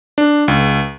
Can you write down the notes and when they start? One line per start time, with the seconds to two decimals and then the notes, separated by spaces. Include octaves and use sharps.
0.18 D4
0.48 C#2